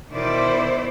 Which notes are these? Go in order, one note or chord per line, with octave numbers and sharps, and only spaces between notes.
B2 D#3 E4 C5 D5